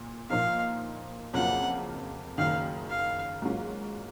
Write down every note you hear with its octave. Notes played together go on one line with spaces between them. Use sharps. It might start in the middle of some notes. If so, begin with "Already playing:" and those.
Already playing: A#2
A#2 F3 A#3 D#4 F5
F2 C#3 F#3 A#3 F4 F#5
F#1 F#2 D#3 F5
F5
G#2 F#3 A#3 C#4 F4